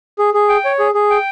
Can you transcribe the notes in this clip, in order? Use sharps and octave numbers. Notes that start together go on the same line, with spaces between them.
G#4
G#4
G5
C#5
G#4
G#4
G5